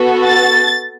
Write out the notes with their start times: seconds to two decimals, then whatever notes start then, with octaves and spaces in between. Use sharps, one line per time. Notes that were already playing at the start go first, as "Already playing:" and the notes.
Already playing: B3 F#4 A4
0.24 A6